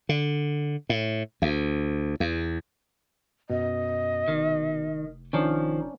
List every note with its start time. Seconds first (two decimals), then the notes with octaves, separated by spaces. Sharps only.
0.09 D3
0.89 A2
1.42 D2
2.20 E2
3.50 F#2 B2 D#5
4.28 F1 D#3
5.33 D#3 F3 C#4 D4